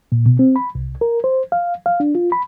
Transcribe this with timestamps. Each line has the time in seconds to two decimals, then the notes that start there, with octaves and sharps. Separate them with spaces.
0.12 A#2
0.26 B2
0.39 C4
0.56 B5
0.75 C2
1.01 A#4
1.24 C5
1.52 F5
1.86 F5
2.00 D4
2.15 F4
2.32 B5